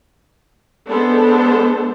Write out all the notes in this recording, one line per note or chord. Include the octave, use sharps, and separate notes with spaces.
G#3 B3 D4 A4 C5